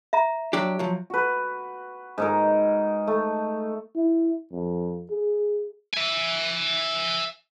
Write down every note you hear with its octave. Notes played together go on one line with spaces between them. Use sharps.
E5 A#5
F#3 D4 G4
F3 F#3
F#4 B4
G#2 D#4 A#4
A3
E4
F2
G#4
E5 G#5